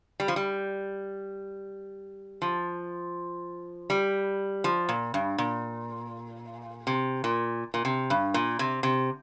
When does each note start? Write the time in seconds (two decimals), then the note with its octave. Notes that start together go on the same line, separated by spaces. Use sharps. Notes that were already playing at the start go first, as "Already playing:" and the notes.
0.20 G3
0.28 F3
0.36 G3
2.42 F3
3.90 G3
4.64 F3
4.89 A#2
5.14 G2
5.38 A#2
6.87 C3
7.24 A#2
7.74 A#2
7.85 C3
8.10 G2
8.34 A#2
8.59 C3
8.83 C3